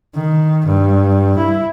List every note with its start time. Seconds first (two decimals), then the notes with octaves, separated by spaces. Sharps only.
0.15 D#3
0.66 G2
1.38 E4